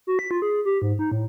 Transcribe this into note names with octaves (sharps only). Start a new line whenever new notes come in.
F#4
B6
F4
G#4
G4
G#2
D#4
A2